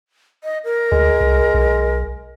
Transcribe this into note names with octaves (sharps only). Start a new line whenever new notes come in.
D#5
A#4
D2 G#3
C2
B1